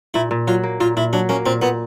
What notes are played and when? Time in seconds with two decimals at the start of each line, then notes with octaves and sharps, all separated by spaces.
0.14 A#2 E4
0.31 A#2
0.47 F#3 F4
0.63 A#3
0.80 A#2 F4
0.96 A#2 E4
1.13 F#3 D4
1.29 A#3 C#4
1.46 A#2 C4
1.62 A#2 B3